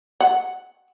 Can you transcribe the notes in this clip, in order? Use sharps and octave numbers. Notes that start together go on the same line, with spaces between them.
F#5